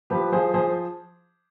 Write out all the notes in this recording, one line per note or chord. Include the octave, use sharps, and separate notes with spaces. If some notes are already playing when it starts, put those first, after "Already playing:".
F3 G4 B4
F3 G#4 C5
F3 G#4 C5